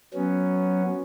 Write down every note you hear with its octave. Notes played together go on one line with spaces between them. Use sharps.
F#3 B3 C#4